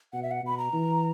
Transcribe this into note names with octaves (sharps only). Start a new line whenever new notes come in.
B2 F#5
E5
F#5
B2 B5
A#5
E3